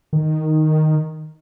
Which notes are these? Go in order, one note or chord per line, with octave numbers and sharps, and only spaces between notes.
D#3